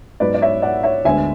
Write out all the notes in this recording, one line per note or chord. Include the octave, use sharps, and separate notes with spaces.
G#2 F#3 B3 B4 D5
D5
C#5 E5
D5 F#5
C#5 E5
D2 D3 G#3 B3 E5 G#5